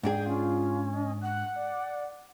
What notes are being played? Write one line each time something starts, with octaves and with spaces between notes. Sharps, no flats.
G#2 D4 G#4 G5
C#4 F4
D#5
F#5 F#6
D5